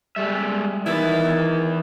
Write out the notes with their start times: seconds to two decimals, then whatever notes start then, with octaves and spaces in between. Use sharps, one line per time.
0.16 G3 G#3 A4 E5
0.86 D#3 E3 B3 E4 A6